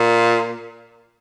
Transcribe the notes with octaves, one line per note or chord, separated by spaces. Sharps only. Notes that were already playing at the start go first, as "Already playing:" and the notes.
Already playing: A#2